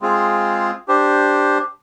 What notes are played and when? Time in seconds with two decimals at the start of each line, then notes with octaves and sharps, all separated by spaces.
0.01 G#3 C4 F4 G#4
0.88 D4 G4 C5